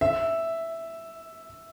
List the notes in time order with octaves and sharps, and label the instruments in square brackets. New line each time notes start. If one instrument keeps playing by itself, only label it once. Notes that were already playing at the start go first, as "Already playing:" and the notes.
[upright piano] E5